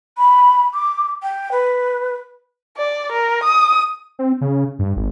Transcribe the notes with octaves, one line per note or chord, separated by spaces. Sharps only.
B5
D6
G5
B4
D5
A#4
D#6
C4
C#3
G2
G#1